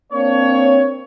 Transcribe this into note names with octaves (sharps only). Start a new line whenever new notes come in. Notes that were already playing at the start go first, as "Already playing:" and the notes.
A#3 C4 D4 C#5